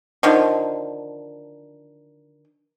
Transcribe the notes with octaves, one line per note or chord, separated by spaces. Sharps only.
D3 D#3 F3